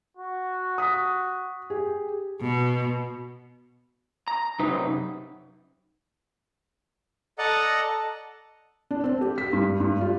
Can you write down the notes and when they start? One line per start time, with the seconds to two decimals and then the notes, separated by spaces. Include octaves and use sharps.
0.17 F#4
0.78 D#6 B6
1.70 G4 G#4
2.41 B2
4.28 A#5
4.59 F#2 C3 D#4 B4
7.38 A4 D5 D#5 F#5 A5 A#5
8.91 D4
9.04 C4
9.21 G4
9.38 B6
9.53 G2
9.80 G2
10.01 F4